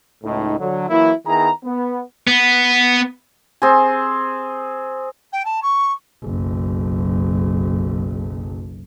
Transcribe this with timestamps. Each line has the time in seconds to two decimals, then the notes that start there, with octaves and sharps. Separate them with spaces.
0.24 C#2 A2 D#4
0.59 D3 F#3
0.89 E3 F#3 A#3 E4
1.27 D#3 B3 E4 G#4 A#5
1.64 B3
2.28 B3
3.62 C4 G#4
5.32 G5
5.45 A5
5.62 C#6
6.23 F#1 B1